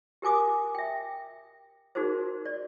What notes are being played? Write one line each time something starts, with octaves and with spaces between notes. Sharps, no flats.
G4 A#4 G#5 D6 D#6
E5 G5
D#4 F#4 G#4 A#4 C5
D5